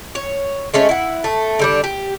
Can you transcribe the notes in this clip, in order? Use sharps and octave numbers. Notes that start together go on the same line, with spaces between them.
C#5
G#3 A3 C#4 C#5
E4 F#5
A3
D3 G3 D4
G4